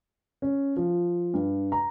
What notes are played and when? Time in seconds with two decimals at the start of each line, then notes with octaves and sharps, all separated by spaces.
0.42 C#4
0.77 F3
1.34 G2
1.72 A#5